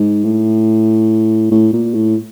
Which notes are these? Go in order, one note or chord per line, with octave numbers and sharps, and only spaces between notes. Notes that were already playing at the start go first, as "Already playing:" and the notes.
Already playing: G#2
A2
A2
A#2
A2